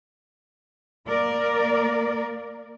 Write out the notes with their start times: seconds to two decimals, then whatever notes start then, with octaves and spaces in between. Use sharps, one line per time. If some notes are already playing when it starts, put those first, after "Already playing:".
1.08 A#3 A#4 D5